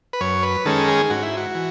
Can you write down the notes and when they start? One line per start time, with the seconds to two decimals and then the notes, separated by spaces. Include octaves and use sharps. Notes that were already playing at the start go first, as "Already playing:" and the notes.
0.13 B4
0.21 F#2 C#5
0.43 B4
0.65 D#3 G#3 C#4 A4
0.88 G#4
1.10 G#2 F#4
1.23 E4
1.37 F#4
1.55 E3